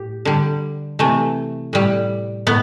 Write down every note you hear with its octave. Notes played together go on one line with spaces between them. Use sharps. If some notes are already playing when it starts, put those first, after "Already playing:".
Already playing: A2 G4
D3 G3
C3 E3 A3
A2 G3
A2 B3